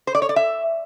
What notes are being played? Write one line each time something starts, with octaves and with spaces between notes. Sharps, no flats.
C5
D5
C#5
D5
E5